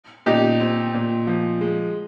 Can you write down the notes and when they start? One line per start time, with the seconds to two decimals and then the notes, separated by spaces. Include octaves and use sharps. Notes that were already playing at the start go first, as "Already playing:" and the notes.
0.26 A#2 D#4 G4
0.60 C4
0.94 A#2
1.27 F3
1.61 G#3